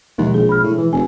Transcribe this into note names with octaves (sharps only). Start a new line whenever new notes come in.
D#2 B2 F3 G#3
A#1 G#4
B5 F6
A2
E3
F1 G#5